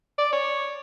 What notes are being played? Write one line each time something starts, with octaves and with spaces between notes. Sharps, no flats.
D5
C#5